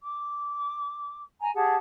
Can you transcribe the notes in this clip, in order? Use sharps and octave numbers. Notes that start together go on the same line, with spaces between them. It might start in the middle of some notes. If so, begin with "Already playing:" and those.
D6
G#5 A#5
G4 G#4 F#5 A5